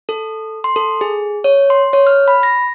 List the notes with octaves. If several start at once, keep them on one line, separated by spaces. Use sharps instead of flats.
A4
C6
A4
G#4
C#5
C6
C#5
F6
B5
A#6